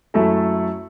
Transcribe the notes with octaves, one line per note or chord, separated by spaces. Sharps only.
F#2 F#3 A3 E4 A4